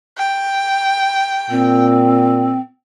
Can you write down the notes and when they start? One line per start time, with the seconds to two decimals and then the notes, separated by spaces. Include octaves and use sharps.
0.18 G5
1.50 A#2 C4